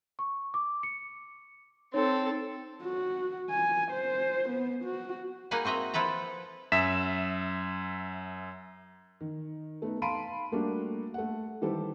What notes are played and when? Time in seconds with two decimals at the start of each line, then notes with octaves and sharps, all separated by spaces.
0.19 C#6
0.54 D6
0.83 C#7
1.94 C4 D#4 A4 C#5
2.84 F#4
3.50 G#5
3.91 C5
4.49 B3
4.85 F#4
5.51 A#3 D#4 G#4 B4 F#5 G#5
5.65 C4 F#4 D#5 E5 A#5
5.94 F3 E4 A4 B4 A#5
6.72 F#2 E5 B6 E7
9.20 D#3
9.82 A3 B3 D#4
10.02 F5 A5 B5 C6 D7 D#7
10.52 G3 A3 A#3 D4 F#4 G4
11.14 A3 F#5
11.61 D#3 E3 G3 G4 A4 C5